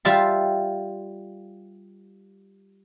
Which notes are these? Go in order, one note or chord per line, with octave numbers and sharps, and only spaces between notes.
G3 F4 E5 F5 A5 C6